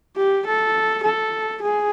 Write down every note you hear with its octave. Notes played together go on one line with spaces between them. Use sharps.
G4
A4
A4
G#4